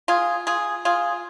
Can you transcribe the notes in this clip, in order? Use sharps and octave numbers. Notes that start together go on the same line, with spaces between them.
F4 G#4
F4 G#4
F4 G#4